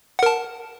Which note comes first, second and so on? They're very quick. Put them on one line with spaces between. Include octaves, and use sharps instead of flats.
F#5 A#4 A5